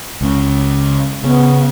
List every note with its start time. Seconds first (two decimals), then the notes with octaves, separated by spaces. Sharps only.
0.21 C#2 C#3
1.24 C#3 B3